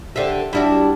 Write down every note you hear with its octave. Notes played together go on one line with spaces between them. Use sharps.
D3 G4 C5 E5
G3 D4 E4 F#4